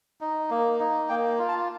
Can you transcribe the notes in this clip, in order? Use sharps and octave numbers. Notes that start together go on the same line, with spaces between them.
D#4
A#3
D#4
A#3 G5
F4
A5